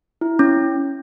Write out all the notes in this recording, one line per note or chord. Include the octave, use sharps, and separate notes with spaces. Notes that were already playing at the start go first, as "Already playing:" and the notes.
E4
C#4